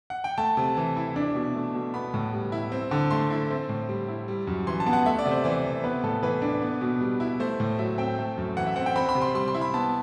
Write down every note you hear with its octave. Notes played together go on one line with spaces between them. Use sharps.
F#5
G5
A3 A5
C3
E3
E4
D4
B2
A3
B2
B3 B5
A2
G3
E4
C4
D3
A3 C6
E4
C4
A2
G3
E4
G3
F#2
E3 C6
A5
B3
F#5
A3 E5
D5
C3
C5
E3 D5
C3
B3 B4
A2 A4
E3 B4
D4
B3
B2
G3
E4
A3 C5
A2
F#3 E5
C4 G5
A3
F#2
E3 F#5
E5
C4 F#5
G5
C4 B5
B5
C3
C6
G3 C6
C6
E4
B5
B3 A5